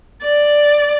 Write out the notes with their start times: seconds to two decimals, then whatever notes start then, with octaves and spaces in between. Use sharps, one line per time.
0.23 D5